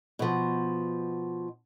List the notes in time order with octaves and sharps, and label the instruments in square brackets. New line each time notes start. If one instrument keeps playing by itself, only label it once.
[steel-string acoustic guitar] B2 F3